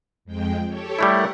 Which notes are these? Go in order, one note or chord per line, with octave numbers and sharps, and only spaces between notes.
F2 G#3 G5
G4 A4 C#5
G3 A3 E4 A#4 F#5